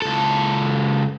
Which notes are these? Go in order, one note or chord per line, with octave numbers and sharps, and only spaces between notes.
C#2 A4